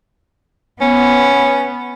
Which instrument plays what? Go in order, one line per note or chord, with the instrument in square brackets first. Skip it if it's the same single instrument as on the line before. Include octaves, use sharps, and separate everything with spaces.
[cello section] B3 [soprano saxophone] C#4